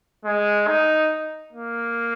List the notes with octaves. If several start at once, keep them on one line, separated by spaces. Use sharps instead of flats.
G#3
D#4
A#3